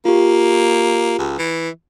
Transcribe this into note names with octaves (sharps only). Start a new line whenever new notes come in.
A#3 F4 G4
C#2
E3